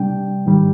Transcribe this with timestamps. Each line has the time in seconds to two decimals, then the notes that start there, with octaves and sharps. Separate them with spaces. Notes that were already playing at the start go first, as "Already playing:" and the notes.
Already playing: C3 G3 D4 G5
0.46 G#2 D#3 G3